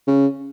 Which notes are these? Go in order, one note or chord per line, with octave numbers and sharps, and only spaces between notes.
C#3